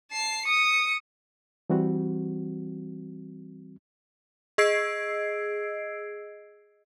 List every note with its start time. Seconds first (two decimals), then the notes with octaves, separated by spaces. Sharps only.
0.12 A5 C7
0.46 D#6 C#7
1.70 E3 G3 C4 F#4
4.58 G#4 D#5 E6 G#6 C7 D7